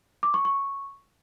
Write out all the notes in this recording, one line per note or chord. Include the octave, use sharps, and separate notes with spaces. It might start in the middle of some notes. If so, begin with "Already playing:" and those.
D6
C#6
C#6